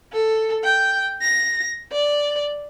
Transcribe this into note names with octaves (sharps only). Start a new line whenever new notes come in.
A4
G5
A#6
D5